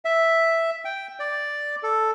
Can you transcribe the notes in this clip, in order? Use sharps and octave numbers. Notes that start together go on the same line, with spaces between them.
E5
G5
D5
A4